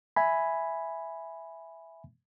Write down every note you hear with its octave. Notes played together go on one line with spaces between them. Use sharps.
E5 G#5 B5